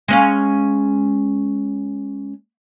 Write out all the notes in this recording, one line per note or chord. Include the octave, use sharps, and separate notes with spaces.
G#3 C#4 F5